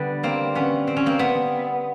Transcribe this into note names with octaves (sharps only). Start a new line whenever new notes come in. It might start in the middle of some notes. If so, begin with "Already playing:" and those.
Already playing: D3 G3 B3
A#3 C4
B3 C#4
C4
C#4
A#3 C4
B3